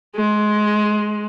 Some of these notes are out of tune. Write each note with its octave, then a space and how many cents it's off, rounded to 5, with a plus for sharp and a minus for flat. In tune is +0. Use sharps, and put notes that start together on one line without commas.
G#3 +20